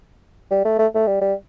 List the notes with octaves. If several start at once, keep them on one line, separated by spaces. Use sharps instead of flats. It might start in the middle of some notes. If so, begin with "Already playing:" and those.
G3
A3
A3
A3
G3
G3